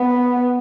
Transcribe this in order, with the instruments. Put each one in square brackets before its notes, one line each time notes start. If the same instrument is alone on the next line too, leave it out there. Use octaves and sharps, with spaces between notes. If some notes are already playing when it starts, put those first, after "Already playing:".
Already playing: [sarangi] B3